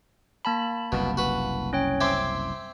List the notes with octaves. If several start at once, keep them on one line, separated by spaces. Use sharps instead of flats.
A#3 A5 B5
F#1 C2 B2
F#4 B4
C#4 C#5 G5
C4 E5 C6 D6 G#6